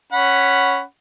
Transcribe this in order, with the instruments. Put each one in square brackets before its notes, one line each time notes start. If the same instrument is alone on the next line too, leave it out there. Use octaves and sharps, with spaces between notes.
[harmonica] C#4 F#5 B5